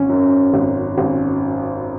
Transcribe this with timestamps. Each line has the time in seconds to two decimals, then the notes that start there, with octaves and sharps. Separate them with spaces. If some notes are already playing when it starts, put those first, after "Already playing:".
Already playing: G#1 C#4
0.09 F#2
0.53 G#1
0.98 G#1